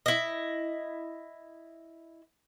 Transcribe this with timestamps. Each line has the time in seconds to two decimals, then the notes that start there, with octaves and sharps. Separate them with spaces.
0.06 E4 D#5